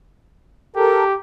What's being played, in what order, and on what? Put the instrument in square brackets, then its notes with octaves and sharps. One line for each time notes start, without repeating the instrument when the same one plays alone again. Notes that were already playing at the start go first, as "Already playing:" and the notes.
[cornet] G4 [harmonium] A4 A#4